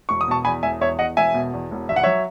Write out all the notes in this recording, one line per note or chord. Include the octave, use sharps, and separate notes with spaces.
E1 C#6
D#6
B2 A5 C#6
E2 G#5 B5
E1 E5 G#5
E2 C#5 E5
E2 D#5 F#5
E1 E5 G#5
B2
E2
E1
G#1 E5
F#5
F#3 C#5 E5